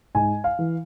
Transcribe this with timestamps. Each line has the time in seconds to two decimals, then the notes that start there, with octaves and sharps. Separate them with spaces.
0.15 G#2 G#5
0.44 F5
0.59 E3